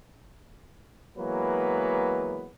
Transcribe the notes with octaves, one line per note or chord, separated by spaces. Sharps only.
E3 F#3 G#3 A#3 B3 B4